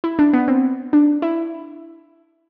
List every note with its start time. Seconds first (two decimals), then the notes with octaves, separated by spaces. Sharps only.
0.04 E4
0.19 D4
0.33 B3
0.48 C4
0.93 D4
1.22 E4